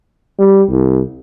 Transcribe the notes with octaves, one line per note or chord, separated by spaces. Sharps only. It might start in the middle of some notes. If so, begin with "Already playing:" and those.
G3
C2